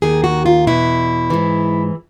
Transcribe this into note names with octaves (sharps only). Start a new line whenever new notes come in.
D#2 D#3 G#4
F#4
F4
E2 B2 E4
G#2 E3